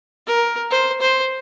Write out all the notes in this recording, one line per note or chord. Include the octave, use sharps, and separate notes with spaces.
A#4
C5
C5